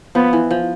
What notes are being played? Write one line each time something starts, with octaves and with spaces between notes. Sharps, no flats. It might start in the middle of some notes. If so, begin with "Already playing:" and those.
F3 B3
E3
F3